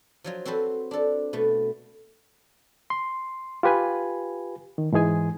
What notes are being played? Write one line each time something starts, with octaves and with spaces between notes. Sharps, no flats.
F3 F#3 F4
C4 F#4 A4 B4 C5
D4 A4
B2 A3 B4
C6
F4 G4 B4 G#5
D#3
G#2 E3 G#3 G#4 G#5